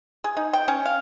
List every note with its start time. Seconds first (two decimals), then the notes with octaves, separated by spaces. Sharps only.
0.24 G#4
0.37 D#4
0.53 G5
0.68 C#4
0.86 F5